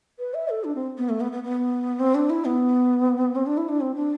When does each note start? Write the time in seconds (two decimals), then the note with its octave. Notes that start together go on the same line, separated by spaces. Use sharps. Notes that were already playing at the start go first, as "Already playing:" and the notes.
0.19 B4
0.34 E5
0.49 A4
0.64 D4
0.75 C4
0.98 B3
1.09 A3
1.21 B3
1.32 B3
1.43 B3
2.00 C4
2.15 D4
2.30 E4
2.45 B3
3.36 C4
3.46 D4
3.57 E4
3.69 D4
3.80 C4
3.95 D4